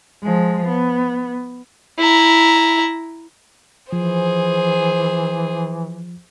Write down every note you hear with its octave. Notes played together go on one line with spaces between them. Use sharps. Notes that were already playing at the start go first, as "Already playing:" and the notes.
F3 G#3
B3
E4 A#5
E3 F3 G#4 C5